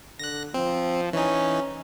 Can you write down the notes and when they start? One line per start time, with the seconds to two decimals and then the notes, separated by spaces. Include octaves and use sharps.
0.19 D3 F#6 A#6
0.54 F3 C4
1.13 E3 C#4 D#4